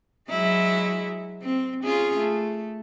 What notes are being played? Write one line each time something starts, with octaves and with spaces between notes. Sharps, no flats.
F#3 G#3 E4
C4
C#4 F4 G#4
A3